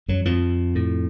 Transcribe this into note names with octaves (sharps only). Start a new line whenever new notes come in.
F#2 F#3
F2 F3
A2